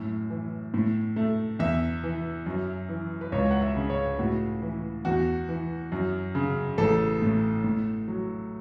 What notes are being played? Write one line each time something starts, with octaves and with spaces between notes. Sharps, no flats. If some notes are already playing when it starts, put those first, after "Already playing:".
Already playing: F#2 A2
E3
A2
A3
E2 E5
E3
F#2
E3
B4
C#2 C#5
F#5
E5
C#3
C#5
A2 F#4
E3
E2 F#4
E3
F#2
C#3
A1 A4
A2
A2
F#3